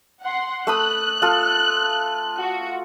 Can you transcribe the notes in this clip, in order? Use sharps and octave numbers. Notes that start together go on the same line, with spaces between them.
F#5 C6
A3 B5 D#6 F#6
F4 A4
F#4